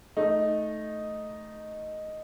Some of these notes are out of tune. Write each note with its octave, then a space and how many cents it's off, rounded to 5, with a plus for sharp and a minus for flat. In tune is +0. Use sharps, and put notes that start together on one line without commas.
A3 -10 D#4 +0